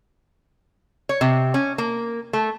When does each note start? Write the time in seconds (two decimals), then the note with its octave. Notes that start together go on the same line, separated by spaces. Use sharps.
1.09 C#5
1.21 C3
1.54 C#4
1.78 A#3
2.33 A3